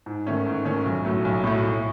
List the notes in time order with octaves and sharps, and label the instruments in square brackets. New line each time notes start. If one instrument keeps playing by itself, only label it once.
[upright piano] G#2
D#3 A3 C#4
G#2
D#3 A3 C#4
B1
A2 F#3 A3
B1
A2 F#3 A3
A2